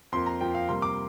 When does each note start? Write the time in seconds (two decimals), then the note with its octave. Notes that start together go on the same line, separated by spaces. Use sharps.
0.12 F2 F3 A#3 C6
0.26 A#5
0.41 F2 F3 A#3 G5
0.55 F5
0.69 C3 G3 A#3 C6
0.82 D6